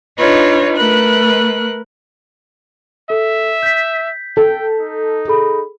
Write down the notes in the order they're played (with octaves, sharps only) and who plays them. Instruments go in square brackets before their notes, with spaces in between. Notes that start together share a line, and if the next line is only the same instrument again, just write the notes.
[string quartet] D4 D#4 F4 B4 C#5
A3 A#4 B4 F#6
[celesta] A4 [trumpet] E5
[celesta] G6 B6
[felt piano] A4 [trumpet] G5
[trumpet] D#4
[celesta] G#4 A4 B5